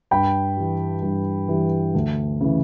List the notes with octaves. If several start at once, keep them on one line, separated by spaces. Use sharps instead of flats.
G2 G5 B5
E3 G3
G2
E3 G3
D2
C#3 E3